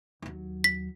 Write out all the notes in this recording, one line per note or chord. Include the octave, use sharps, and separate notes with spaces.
D#2 F#3
B6